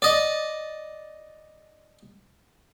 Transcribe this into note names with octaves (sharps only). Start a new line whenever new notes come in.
D5 D#5